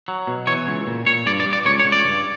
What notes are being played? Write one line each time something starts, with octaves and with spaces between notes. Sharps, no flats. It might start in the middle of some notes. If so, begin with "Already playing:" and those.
F#3
B2
E3 C#5
C#2
A#2
A#2 C#5
G2 D5
D5
G2
D5
C#2 C#5
C#5
C#2
D5
G2